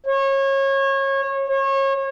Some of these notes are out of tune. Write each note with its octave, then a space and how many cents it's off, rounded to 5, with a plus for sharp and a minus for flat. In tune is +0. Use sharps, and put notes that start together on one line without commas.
C#5 -25
C#5 -30